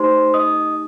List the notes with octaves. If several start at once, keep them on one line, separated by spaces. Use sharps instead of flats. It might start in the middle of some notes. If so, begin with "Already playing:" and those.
Already playing: A3 D#4 G4 C5 C6
D#5 D#6